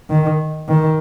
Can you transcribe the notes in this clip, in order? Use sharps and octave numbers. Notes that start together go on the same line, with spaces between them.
D#3
D#3